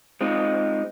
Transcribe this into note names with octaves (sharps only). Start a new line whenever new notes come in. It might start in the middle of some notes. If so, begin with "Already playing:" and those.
G#3 C4 D#4 F4